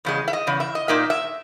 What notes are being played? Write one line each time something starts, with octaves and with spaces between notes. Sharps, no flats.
E2 C#3 G#3
E5
D#5
E2 C#3
E5
D#5
A#2 A#3 D#4 E5
E5